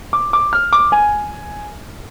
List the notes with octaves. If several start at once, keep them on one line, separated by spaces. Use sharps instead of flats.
D6
D6
F6
D6
G#5